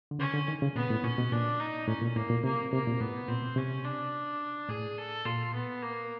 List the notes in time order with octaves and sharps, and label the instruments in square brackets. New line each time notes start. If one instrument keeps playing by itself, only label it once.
[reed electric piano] D3
[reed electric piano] C#3 [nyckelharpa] C#4
[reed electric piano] D3
D#3
C#3
[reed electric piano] A#2 [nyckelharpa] B3
[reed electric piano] A2
[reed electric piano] A#2 [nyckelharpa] C#4
[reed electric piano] B2
[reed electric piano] A#2 [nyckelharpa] D4
[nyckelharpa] D#4
[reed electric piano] A2 [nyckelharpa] C#4
[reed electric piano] A#2
[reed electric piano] A2 [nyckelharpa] A#3
[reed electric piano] A#2
[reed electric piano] C3 [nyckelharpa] A#3
[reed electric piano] C3 [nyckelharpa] A#3
[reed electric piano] A#2
[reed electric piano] A2 [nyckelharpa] B3
[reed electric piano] A#2 [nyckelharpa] C4
[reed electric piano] B2
[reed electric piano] C3 [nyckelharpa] C#4
[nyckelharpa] D4
[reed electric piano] A2 [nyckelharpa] G#4
[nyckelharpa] A4
[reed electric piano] A#2 [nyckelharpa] F4
[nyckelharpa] B3
A#3